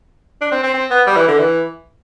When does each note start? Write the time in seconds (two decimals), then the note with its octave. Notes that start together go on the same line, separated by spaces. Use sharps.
0.41 D4
0.52 C4
0.63 C4
0.74 C4
0.91 B3
1.07 G3
1.16 E3
1.28 D3
1.38 E3